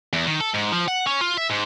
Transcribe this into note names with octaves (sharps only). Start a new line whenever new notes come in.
E2
D#3
A4
G#2
F3
F#5
C#4
F4
E5
G#2